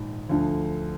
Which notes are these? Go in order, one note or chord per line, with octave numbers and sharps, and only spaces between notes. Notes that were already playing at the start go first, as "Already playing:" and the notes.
Already playing: A#1 G#2 D#3
D2 D3 F3